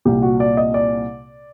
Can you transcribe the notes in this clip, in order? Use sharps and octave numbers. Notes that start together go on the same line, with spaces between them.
C2 A#2 G4
F#4
D5
D#5
D5